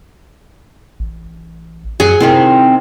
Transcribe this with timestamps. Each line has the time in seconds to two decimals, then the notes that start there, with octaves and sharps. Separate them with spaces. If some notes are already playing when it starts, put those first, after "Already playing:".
1.00 A1
2.00 F#2 F#3 G#4
2.20 C3 D#3 C4 E4